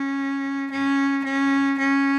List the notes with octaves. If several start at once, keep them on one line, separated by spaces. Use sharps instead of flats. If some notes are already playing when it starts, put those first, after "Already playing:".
Already playing: C#4
C#4
C#4
C#4